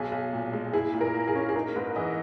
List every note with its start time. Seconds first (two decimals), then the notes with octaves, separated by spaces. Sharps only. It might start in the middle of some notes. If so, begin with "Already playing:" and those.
Already playing: B1 G#4
0.12 B1
0.33 A#2
0.53 G#3
0.73 E4 G#4
0.94 A#2
1.01 A#4
1.14 A#3
1.28 G#4
1.35 C#4
1.49 G#4
1.56 D#4 A#4
1.76 G#2 B4
1.96 E3 D#5